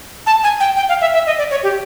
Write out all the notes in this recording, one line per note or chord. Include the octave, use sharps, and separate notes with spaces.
A5
G#5
G5
G5
F5
E5
E5
D#5
D5
C#5
G4